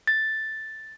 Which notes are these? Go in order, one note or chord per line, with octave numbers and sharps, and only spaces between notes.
A6